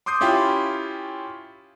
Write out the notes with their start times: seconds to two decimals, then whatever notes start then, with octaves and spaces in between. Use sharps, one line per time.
0.06 C6 D6 D#6 G6 C7
0.21 C#4 E4 F4 G4 G5